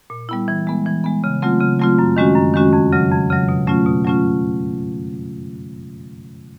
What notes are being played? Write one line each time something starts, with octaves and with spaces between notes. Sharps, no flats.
A#2
G3 B3 E4
E3
G#3 B3
E3
G#3 B3
C#3
F#3 A3 C4 F4
C#3
F#3 A3 C4 F4
F#2
D#3 G#3 C#4 F#4
F#2
D#3 G#3 C#4 F#4
F2
C#3 F#3
F2
C#3 F#3
B2
F#3 A3 C#4 F4
B2
F#3 A3 C#4 F4